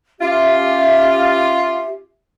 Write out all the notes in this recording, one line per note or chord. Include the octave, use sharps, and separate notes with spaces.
C#4 F4 G4 E5